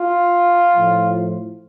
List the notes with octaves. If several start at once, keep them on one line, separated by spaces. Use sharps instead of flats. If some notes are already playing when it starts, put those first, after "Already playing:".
Already playing: F4
A2 F3